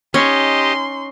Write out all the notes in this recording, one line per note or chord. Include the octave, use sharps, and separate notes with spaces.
C#4 D#4 G4 D#5 C6